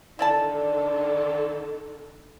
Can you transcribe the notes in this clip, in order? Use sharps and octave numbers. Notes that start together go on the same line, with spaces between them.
D3 D#3 D4 E4 A4 D5 A5